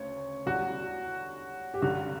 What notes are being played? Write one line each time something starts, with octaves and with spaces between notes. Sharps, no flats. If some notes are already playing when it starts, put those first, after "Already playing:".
Already playing: D2 C#3 C#5
E2 D3 G3 F#4
G4
G2 D3 F#3 F#4